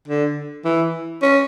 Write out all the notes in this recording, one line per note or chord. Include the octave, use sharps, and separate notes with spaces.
D3
E3
C#4